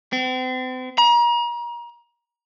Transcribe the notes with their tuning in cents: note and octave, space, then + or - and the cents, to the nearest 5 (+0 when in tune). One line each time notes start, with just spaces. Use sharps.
C4 -40
A#5 +35